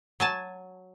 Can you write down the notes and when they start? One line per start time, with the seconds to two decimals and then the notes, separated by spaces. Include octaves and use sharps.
0.20 F#3 G#5 A5